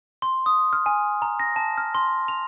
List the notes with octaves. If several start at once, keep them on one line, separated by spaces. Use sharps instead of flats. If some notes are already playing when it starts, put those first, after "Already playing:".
C6
D#6
F6
G#5
A#5
A#6
A5
F6
C6
F7